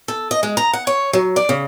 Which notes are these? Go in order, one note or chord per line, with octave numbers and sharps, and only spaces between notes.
A4
D#5
G#3
A#5
F#5
C#5
F#3
D5
C#3